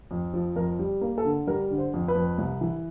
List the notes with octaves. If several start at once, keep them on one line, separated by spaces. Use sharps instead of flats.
F2
F3
F2 A#4
G3
A#3
A4
D3
G3 A#4
D3
C5
F2
B4
F2
C2
E3